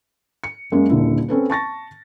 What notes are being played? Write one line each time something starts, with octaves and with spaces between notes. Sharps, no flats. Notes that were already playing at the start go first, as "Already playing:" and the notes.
C#7
F#2 G#3 A#3 C#4
D#1 A#2 D3 E4
C4 C#4 A4 B4
A5 C#6 A6 A#6